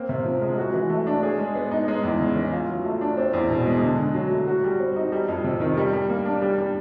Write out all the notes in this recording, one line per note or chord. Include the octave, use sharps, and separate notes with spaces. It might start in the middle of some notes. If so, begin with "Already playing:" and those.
Already playing: A#3 C4
C3
F3
G#3
F#4
E3
A3
D4
G#4
G#3
B3
D#4
G#3
E2
C#3
E3
F4
F#3
A3
D4
C4
E2
B2
G#3
D3
D3
F#3
A3
F#4
G3
C4
D#4
G3
F2
C3
D#3
G3
G3
A#3
D4
G3
G3